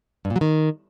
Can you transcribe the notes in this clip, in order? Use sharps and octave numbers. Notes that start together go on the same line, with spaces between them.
G2
A#2
F#3
D#3